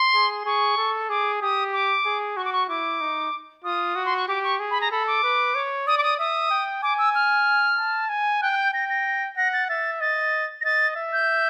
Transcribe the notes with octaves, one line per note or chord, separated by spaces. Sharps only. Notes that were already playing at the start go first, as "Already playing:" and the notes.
Already playing: C6
G#4
G#4 C#6
A4
G#4 D6
G4 D#6
D6
G#4
F#4 C#6
D6
C#6
E4 D6
D#4
F4 D#6
F#4
C6
C#6
G4 D6
C#6
G#4
B5
A#5
A4 B5
D6
B4
C#5
D5 D#6
D6
D#6
E5 D#6
G5
G#5 D6
E6
F6
A5
G#5
G5 F#6
F#6
G6
G5 A#6
A#6
F#5 A#6
A6
E5 A6
D#5 A6
A#6
D#5 A6
E5
G6